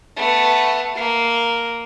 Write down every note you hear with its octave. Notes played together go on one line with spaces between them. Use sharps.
A3 B3
A#3